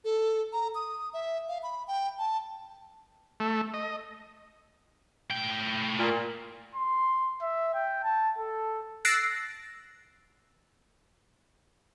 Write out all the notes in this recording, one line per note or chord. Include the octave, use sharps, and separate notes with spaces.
A4
A#5
D#6
E5
F5
B5
G5
A5
A3
D#5
A2 G5
A#2
C6
E5
G5
A5
A4
E6 F#6 A6 A#6 C7 D7